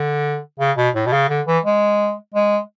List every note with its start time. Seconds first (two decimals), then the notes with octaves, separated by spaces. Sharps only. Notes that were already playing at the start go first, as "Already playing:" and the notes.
Already playing: D3
0.59 C#3
0.77 B2
0.95 A2
1.06 B2
1.12 C#3
1.29 D3
1.46 E3
1.65 G#3
2.34 G#3